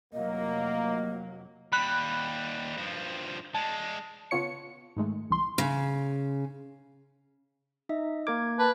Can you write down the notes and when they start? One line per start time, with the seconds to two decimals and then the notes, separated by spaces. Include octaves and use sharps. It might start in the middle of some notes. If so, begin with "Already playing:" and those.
0.13 F1 F#3 A#3 D#5
1.72 D#2 G3 B5 F#6
2.77 G2 F3
3.54 G#3 D4 A5
4.31 C#3 B3 F4 C#5 C#7
4.97 G#2 D#3 G#3 A3
5.30 C2 E3 C6
5.58 C#3
7.89 D#4 D#5 E5
8.27 A#3 A#4 D6 G#6
8.59 B4 A5